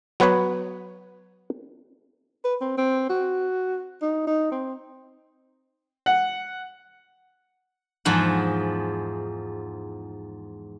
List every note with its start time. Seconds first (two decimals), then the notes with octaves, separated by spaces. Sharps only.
0.20 F#3 B3 B4 C#5 F#5
2.44 B4
2.61 C4
2.77 C4
3.10 F#4
4.02 D#4
4.27 D#4
4.52 C4
6.06 F#5
8.05 E2 G#2 F3 F#5